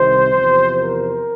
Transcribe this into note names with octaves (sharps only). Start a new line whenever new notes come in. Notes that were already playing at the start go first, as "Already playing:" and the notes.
Already playing: C2 C3 D#3 C5
E2 C3 F3
A#4